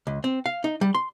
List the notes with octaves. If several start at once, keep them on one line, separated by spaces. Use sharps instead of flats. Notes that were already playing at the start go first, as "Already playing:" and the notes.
C#2
C4
F5
D#4
G3
C6